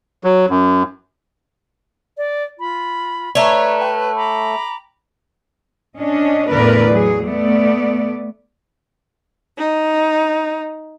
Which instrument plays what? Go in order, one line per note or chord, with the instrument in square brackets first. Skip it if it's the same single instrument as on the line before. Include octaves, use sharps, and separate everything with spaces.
[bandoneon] F#3
F#2
[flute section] D5
F4 B5
[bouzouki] A3 C#5 [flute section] B4 [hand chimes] D5 A#5
[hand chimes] G5
[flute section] A#5 B5 D6
[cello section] C#4 D4 D#5
E2 A2 D3 A#4 B4 D5
F#3 G#4
A3 B3 D5
[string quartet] D#4